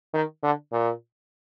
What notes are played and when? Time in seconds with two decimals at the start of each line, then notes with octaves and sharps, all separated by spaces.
0.14 D#3
0.43 D3
0.72 A#2